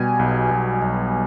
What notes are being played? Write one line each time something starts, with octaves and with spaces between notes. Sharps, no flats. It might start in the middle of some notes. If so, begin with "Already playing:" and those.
Already playing: B2 G3 G#5
B1
B1
B1